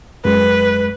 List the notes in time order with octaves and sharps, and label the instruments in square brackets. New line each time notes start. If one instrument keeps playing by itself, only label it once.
[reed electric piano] F#2 G#3 [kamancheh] B4